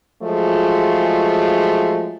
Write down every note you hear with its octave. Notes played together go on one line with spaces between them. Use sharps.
F3 F#3 G#3 A3 F4 G#4